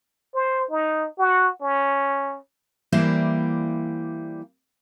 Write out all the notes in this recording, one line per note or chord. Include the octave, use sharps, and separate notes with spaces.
C5
D#4
F#4
C#4
E3 G3 A#3 E4 C5 D5